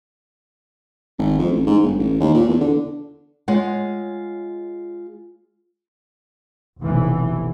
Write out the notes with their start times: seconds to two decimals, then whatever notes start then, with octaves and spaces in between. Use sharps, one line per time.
1.19 G#1
1.39 F2
1.52 A1
1.67 G#2
1.83 G1
1.99 A1
2.20 D#2
2.35 A#2
2.49 E2
2.61 D3
3.48 G#3 F4 C#5 F5 F#5
6.81 F1 B1 E3